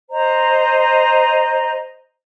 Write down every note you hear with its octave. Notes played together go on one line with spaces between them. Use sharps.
C5 D#5 A#5